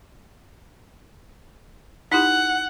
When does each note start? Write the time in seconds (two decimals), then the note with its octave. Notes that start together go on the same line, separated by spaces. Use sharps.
2.12 D#4 E4 G4 F#5